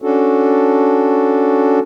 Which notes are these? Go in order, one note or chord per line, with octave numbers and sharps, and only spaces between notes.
C#4 D4 F#4 A4